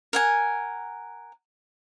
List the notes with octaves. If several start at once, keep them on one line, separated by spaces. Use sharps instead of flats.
A#4 F#5 G#5